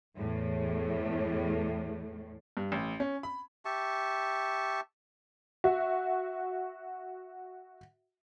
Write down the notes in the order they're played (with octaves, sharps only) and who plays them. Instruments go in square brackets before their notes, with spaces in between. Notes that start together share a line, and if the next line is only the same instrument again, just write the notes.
[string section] E2 A2
[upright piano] G2
A1
C#4
B5
[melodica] G4 E5 A5 C#6
[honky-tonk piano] F#4 E5